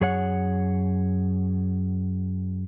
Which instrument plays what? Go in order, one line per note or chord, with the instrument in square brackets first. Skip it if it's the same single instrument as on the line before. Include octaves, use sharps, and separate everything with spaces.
[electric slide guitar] F#2 G#4 C#5 F#5